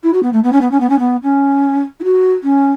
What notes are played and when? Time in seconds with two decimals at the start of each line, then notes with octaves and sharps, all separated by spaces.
0.03 E4
0.13 F#4
0.23 B3
0.33 A3
0.43 B3
0.52 C#4
0.61 B3
0.71 C#4
0.80 B3
0.89 C#4
0.99 B3
1.23 C#4
2.00 E4
2.04 F#4
2.43 C#4